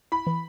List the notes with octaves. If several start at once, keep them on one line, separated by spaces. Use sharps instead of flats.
E4 B5
E3